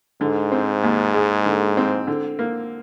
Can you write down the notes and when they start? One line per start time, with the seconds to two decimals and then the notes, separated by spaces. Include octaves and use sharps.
0.21 G#2 D3
0.52 C4
0.83 D#2
1.14 G#3
1.46 D3
1.77 C4
2.07 D3
2.39 A#3